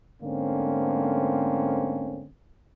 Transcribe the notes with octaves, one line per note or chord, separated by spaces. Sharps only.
G#2 D3 A3 A#3 C4 C#4